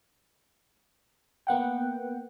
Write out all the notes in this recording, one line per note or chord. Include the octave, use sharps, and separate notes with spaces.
A#3 B3 F#5 G5